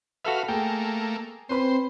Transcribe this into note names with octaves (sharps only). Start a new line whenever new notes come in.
F#4 A4 B4 E5 F5
A3 A#3 G#4 G5
C4 C#4 B4 C5 B5